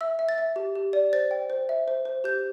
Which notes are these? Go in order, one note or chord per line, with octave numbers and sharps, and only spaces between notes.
E5 E6
E5
A6
E5
G4
G4
D5
C5 A6
G5
C5
E5
C5
C5
G4 G6